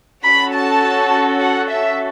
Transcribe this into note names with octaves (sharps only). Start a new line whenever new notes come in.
C#4 F#4 A4 B5
A5
F#5
E5